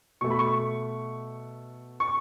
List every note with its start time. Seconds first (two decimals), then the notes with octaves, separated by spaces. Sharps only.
0.21 B2 A3 C#6
0.31 B5
0.39 C#6
2.00 C#6